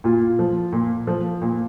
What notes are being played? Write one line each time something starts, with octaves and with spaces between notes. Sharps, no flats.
A#2 F4
F3
A#2
F3
A#2